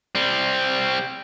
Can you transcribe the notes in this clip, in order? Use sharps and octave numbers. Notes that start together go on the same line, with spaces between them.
G3 C4